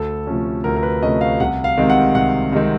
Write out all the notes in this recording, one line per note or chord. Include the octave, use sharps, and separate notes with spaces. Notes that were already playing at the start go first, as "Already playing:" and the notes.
Already playing: D2 A4
C3 F3 A3 C#4
D2 A#4
A#4
B4
C3 F3 A3 C#4 D#5
F5
C2 F#5
F5
C3 D#3 G#3 C4
F#5
C2 F#5
C3 D#3 G#3 C4